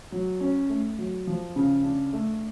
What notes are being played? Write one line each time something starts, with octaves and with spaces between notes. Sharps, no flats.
F#3
C#4
A3
F#3
F3
C#3
D4
A3